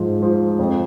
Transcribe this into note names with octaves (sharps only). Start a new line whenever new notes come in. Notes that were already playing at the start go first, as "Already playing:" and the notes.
Already playing: G#2 F3 G#3
F3
F2